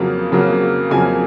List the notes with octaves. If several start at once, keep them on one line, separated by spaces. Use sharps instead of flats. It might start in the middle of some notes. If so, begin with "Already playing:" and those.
Already playing: F2 C#3 F#3 A#3
F2 C#3 F#3 A#3
F2 C#3 F#3 A#3 G#5